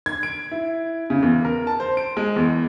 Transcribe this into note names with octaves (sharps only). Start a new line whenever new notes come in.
G#6
D7
E4
C#3
E2
A#4
A5
C5
D7
G#3
E2